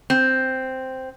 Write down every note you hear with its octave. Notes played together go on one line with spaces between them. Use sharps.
C4